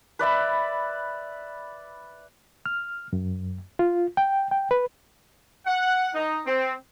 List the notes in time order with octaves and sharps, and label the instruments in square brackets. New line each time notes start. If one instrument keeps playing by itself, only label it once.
[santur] B4 D5 E5 B5
[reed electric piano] F6
F#2
F4
G5
G5
B4
[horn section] F#5
D#4
C4